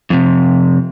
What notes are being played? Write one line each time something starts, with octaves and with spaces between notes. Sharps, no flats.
F2 C3